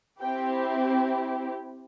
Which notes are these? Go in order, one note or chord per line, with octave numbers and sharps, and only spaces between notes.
C4 E4 G4 G5